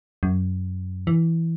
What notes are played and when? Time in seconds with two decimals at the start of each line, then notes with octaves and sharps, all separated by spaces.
0.23 F#2
1.07 E3